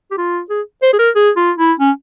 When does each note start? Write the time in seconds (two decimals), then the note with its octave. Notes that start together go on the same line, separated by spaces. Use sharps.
0.11 G4
0.18 F4
0.50 G#4
0.82 C5
0.93 G#4
0.99 A#4
1.15 G#4
1.37 F4
1.58 E4
1.80 C#4